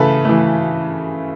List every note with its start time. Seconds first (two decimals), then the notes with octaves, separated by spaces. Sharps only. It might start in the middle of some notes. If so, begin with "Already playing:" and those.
Already playing: C#3 E3 A3 A4 B4
0.25 E3 A3